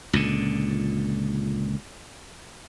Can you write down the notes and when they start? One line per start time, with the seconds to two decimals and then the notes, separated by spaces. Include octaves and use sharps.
0.13 C#2 A#2 D3